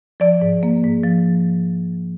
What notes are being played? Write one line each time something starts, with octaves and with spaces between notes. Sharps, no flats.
F3 D5
G#2
A#3
G#2
F3